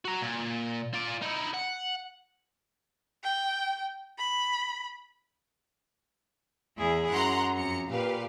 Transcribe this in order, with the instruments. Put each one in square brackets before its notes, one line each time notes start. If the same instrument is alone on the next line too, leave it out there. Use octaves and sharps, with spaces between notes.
[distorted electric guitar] F#4 A#5
A#2
F4 D5
D#4 E4
F#5
[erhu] G5
B5
[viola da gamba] E2 E4 G#4
[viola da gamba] F#2 [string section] F#5 A#5 C6
[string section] F2 A#5 C#7
[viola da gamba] A#2 [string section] G4 B4 F5